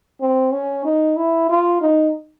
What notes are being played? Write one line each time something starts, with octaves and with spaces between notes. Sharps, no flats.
C4
C#4
D#4
E4
F4
D#4